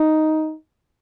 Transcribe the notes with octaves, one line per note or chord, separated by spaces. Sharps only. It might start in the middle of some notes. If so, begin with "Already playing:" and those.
Already playing: D#4